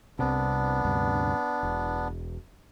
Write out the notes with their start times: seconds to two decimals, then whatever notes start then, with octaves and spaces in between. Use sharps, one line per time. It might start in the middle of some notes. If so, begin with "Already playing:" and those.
0.19 C2 C3 B3 D4
0.85 D2 G2 C3
1.63 E1